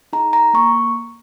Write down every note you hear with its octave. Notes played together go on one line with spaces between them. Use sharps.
D#4 G#4 A#5
A#5
A#3 C#6